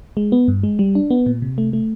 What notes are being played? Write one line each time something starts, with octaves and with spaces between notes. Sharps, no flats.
G#3
B3
G2
G#3
G3
D4
B3
A#2
C3
A3
A3